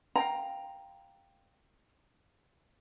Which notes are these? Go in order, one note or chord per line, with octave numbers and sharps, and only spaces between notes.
F5 G5 A#5